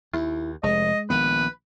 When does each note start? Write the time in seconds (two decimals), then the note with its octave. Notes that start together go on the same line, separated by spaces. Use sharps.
0.13 D#2 E4
0.63 F1 G#3 D#5
1.10 A#1 D#3 B3 B4